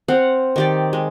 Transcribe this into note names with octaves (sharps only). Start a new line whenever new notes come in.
C4 F5 F#5
D#3 G4 D5
G#3